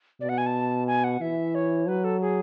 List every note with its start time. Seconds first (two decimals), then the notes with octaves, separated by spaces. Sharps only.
0.21 B2 D5
0.29 F#5
0.38 G#5
0.46 A5
0.87 G#5
1.04 F#5
1.21 E3 E5
1.55 C#5
1.88 F#3 B4
2.04 A4
2.21 G#4